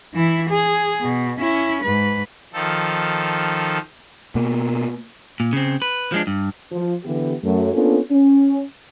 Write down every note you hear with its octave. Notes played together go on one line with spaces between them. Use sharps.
E3 E4
G#4
B2
C#4 E4
G#2 B4
D#3 F3 A4
B2 A#3
A#2
C#3 C4
B4
F3 G#3 D4
G2
F3
D3 E3 B3 G4
F#2 F#3 A3
A#3 B3 C#4 D4 F4 A4
C#4